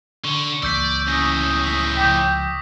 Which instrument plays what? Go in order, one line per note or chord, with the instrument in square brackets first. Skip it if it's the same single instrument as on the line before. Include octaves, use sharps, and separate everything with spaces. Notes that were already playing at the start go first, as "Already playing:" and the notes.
[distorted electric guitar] D3 [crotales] C#6 G7
[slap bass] C#2 E3 A#3 [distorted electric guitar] D5 [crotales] E6 G6 B6
[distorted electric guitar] A2 C#3 [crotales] D#6 A#6
[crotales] D#6 B6
[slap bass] C#2 F3 [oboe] G5 [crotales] D6 B6